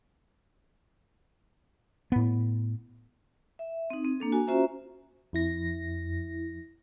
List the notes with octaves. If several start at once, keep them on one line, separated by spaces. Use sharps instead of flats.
A2 B3
E5
C4 D#4
C4
A#3 D4 A4
F#4 G#5
C#4 F4 F#4 C5 E5 A#5
F2 E4 A#6